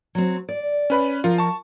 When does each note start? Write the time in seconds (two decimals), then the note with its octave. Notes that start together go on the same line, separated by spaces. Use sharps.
0.15 F#3 C4
0.49 D5
0.90 C#4 B4 B5
1.24 F3 F4 A#4
1.38 A5 C#6